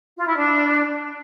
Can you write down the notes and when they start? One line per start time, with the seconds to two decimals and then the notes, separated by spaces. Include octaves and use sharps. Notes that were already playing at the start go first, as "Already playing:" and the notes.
0.17 F4
0.27 E4
0.36 D4